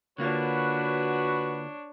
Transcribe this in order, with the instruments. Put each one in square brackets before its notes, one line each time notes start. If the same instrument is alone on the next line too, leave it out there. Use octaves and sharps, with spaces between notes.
[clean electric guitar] D3 A#3 F4 [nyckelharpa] D4 C#5 [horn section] F#4 B4